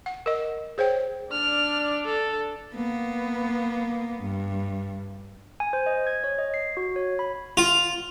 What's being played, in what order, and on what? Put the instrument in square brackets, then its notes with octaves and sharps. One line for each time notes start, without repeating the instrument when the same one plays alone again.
[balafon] F#5
A#4 D#5
G#4 C5 C#5 G5
[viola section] D4 D5 [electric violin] F6
[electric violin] A4
[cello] A#3 B3
G2
[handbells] G#5
C5
D#5
G#6
C#5
D#5
C7
F#4
C#5
B5
[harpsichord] F4